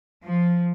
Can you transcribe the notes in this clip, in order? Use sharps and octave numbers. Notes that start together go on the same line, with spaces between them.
F3